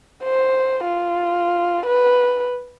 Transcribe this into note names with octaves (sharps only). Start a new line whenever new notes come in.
C5
F4
B4